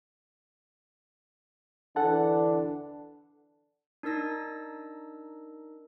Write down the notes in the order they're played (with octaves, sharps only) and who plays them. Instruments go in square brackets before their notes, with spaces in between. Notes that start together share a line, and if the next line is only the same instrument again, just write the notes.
[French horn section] D3 E3 D4 [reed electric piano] A4 F#5 A5
[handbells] D4 D#4 A#4 E6 A#6